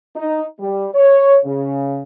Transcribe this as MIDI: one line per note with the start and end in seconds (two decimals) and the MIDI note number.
0.16 0.45 63
0.60 0.87 55
0.95 1.37 73
1.45 2.01 49